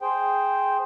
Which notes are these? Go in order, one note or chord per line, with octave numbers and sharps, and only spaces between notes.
G#4 C5 G5